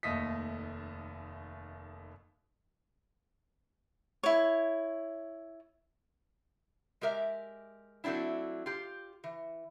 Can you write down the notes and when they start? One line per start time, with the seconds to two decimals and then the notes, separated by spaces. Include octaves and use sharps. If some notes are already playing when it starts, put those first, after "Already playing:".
0.03 F1 D#2 A3 D#5 B6
4.23 E4 C#5
7.01 G#3 G4 A#4 E5
8.04 F#3 A3 C4 D4 E4
8.66 F4 G4
9.24 E3